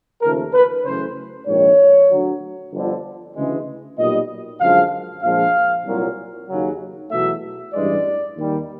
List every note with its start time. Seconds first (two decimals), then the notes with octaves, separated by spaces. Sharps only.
0.22 D#2 C#3 F3 A3 A#4
0.54 B4
0.85 F#2 C#3 E3 A3 C5
1.47 A#1 G#2 D#3 C#5
2.10 D2 D3 F#3
2.72 G1 F2 D3
3.36 D2 C#3 E3 G#3
3.98 B1 A#2 G3 D#5
4.61 F#2 D3 F3 G#3 F5
5.23 A#1 A#2 F3 G#3 F5
5.85 C2 A#2 F#3
6.49 D#2 C#3 F#3
7.11 E2 B2 F#3 A3 E5
7.74 A1 G2 E3 G#3 D5
8.36 D#2 D#3 G3